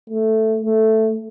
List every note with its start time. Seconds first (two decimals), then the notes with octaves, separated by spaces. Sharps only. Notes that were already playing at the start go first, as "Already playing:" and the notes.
0.10 A3
0.62 A3